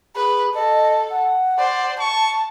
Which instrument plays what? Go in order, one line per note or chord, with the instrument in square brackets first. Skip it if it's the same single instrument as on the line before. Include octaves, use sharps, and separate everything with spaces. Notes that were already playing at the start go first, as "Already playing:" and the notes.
[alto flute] G#4 [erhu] B4
[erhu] A4 [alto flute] D#5
[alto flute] F#5
[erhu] C5 [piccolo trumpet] D5
[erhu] A5 [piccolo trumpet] C#6